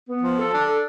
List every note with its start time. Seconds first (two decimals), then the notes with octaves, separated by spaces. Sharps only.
0.09 B3
0.23 F3
0.38 A4
0.53 D4
0.67 A4